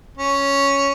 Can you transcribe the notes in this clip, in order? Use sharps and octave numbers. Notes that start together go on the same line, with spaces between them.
C#4